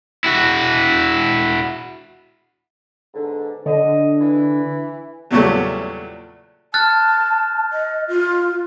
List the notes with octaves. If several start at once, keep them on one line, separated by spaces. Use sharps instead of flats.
E4 F#4
G#2 B2 D3
D3 D#5
E3
E2 A#2 C#3 F#3 G3 A3
A5 F6 F#6 A6
D#5
F4